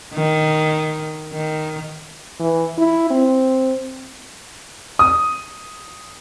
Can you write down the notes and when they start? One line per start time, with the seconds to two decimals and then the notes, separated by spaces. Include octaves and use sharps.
0.14 D#3
1.32 D#3
2.40 E3
2.78 E4
3.11 C4
4.99 D#6